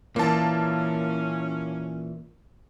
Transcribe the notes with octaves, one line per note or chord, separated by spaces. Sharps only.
A#2 E3 A#3 C#4 A5